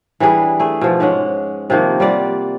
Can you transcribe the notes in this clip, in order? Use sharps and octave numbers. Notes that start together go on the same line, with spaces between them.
E3 G3 D4 G#4
A3 G#4
B2 F3
G#2 G#3 C#4 F#5
C3 D#3 F3 A#3
G3 F4 D5 F#5